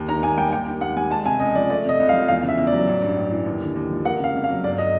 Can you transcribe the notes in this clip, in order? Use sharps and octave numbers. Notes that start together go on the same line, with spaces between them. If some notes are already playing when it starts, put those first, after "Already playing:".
Already playing: D#2
D#3 A#5
D#2 G#5
G3 G5
D#2 G5
D#3
D#2 F#5
G3 G#5
G#3 A5
C3 G#5
C#2 D#5
F3 D5
A3 D5
C3 D#5
C2
F5
F3
E2 F5
C#3 E5
E2
D5
F#3
A1
G2
A1
E3
D#2
D3
D#2
F3
A#3 F#5
C#3 F5
F2
F5
F#3
G1 D5
D#5